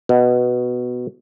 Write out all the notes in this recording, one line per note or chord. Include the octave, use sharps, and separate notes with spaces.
B2